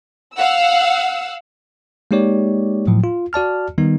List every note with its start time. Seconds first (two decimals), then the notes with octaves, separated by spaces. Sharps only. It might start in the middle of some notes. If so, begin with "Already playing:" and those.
0.35 F5 F#5 E6
2.11 G#3 A#3 D#4 G4 C#5 D5
2.87 A2 F3 F#3
3.04 F4
3.33 F#4 D5 A5 F6
3.78 D#3 G3 B3 D#4